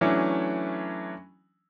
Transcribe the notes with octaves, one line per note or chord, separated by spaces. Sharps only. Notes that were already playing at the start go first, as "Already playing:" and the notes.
E3 F#3 A3 C#4 D4